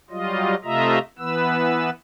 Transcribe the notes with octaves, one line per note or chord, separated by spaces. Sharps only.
F#3 G3 F4 D#5
C3 A3 F4 D#5 E5 A#5
E3 B3 B4 E6